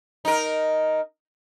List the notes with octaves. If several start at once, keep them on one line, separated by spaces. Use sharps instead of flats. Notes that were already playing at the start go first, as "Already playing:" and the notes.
D#4 A#4